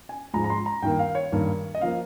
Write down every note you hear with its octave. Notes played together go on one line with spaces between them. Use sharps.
G#5
G#2 F3 G#3 A#5
A#5
C6
A#5
G2 D#3 A#3 G5
F5
C#5
G2 D#3 A#3
D#5
F3 A#3 F5